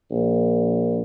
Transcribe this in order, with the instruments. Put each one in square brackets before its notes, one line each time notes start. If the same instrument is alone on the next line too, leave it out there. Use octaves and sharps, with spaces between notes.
[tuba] A#1